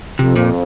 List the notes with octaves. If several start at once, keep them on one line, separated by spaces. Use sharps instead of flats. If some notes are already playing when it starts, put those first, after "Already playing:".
F2 C3 F3
A#2